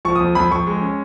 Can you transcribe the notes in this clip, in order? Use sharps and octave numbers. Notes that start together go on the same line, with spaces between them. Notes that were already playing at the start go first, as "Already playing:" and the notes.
F3 C#6
D#6
F2
F2 B5
F2 C#6
G#3
C#4